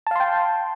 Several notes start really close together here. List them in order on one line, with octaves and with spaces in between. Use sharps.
A5 F5 C6 G5